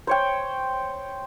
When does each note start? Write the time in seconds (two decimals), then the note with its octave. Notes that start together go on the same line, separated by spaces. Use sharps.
0.07 C5 C#5 G5